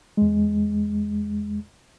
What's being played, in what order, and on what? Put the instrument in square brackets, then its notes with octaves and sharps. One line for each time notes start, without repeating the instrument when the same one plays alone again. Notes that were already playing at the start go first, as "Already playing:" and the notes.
[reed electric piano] E2 G#3